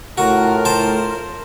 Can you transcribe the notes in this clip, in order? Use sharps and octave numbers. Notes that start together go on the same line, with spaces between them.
A2 F4 F#4 A#4
C5 A5
A#4